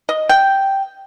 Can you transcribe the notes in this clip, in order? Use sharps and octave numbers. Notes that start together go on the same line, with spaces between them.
D#5
G5